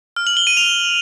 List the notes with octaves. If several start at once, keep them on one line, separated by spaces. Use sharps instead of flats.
F6
F#7
G7
D#7
F7